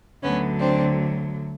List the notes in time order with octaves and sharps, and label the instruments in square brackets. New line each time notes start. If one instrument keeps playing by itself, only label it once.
[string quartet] D2 D3 F#3 B3 C#4
C4 D4